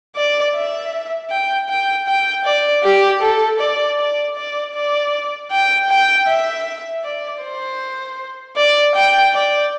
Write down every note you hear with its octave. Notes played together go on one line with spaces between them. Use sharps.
D5
E5
G5
G5
G5
D5
G4
A4
D5
D5
D5
D5
G5
G5
E5
D5
C5
D5
G5
D5